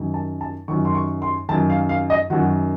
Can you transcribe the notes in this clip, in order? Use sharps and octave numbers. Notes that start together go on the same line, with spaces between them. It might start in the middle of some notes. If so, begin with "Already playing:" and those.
Already playing: F#2 D#3
A5
A5
F#2 D#3 C#6
C6
C#6
C6
F#2 D#3 A5
F5
F5
D#5
F#2 D#3 F#4